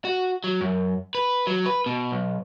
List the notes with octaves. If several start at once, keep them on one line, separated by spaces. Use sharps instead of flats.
F#4
F#3
F#2
B4
F#3
B4
B2
B1